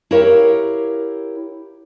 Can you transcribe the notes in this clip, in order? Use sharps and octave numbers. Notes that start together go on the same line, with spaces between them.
E4 G4 A#4 C#5 F5